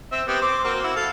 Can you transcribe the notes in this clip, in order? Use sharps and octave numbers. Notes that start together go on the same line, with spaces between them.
C4 E5
B3 C4 G4
C4 C6 D6
A#3 C4 F#4
E4 F#4
A4 F5